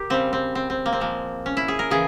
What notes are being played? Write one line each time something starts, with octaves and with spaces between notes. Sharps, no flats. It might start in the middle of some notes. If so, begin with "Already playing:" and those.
Already playing: G4 A#4
C#3 G3 C4
C4
C4
C4
A#3
C4
A#2 F3 G#3 A#3
C#4
E4
G#4
A#4
C#3 E3 G#4